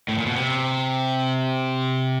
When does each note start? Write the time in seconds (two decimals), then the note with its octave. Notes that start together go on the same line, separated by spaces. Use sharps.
0.08 A2
0.18 A#2
0.26 B2
0.36 C3